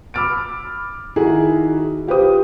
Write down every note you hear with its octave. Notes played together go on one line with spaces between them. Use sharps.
B5 D6 E6 F6 A6 D7
D#3 D#4 E4 F#4 G#4
F4 G4 B4 C5 D#6